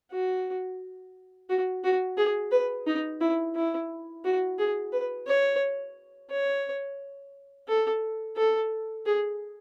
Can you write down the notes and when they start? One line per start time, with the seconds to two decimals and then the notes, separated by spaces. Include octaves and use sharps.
0.12 F#4
1.50 F#4
1.84 F#4
2.17 G#4
2.52 B4
2.87 D#4
3.21 E4
3.55 E4
4.25 F#4
4.59 G#4
4.92 B4
5.27 C#5
6.30 C#5
7.68 A4
8.37 A4
9.06 G#4